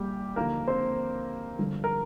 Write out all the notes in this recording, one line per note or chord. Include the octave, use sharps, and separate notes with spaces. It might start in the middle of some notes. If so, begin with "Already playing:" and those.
Already playing: A#1 A#2 G3 G4
D#2 D3 F3 A#3 A#4
C4 C5
G1 G2 D3 F3
A#4